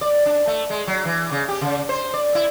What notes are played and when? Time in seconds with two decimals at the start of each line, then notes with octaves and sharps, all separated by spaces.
0.01 D5
0.26 D4
0.47 A3
0.70 G#3
0.87 F#3
1.05 E3
1.31 C#3
1.49 G4
1.61 C#3
1.89 C5
2.14 D5
2.35 E4